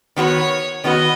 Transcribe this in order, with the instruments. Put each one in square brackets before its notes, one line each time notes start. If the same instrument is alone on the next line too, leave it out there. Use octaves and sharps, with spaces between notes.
[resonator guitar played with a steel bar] D#3 B3 F#4 B4 [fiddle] C#5
[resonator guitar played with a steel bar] D#3 B3 F#4 B4 [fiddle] D#5